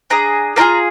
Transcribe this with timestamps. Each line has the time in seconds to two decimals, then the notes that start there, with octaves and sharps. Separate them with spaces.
0.10 D4 G#4 A#5
0.56 A#3 D4 F4 G#4 A#5